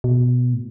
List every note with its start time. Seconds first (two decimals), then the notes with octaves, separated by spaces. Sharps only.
0.04 B2
0.54 A2